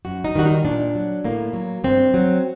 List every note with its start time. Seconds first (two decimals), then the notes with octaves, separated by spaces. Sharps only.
0.05 F#2 F#4
0.25 D#4
0.35 D#3 G3 F#4
0.45 D#4
0.65 A#2 D4
0.95 F#3
1.24 A2 A#3
1.53 F#3
1.84 G2 C4
2.14 F#3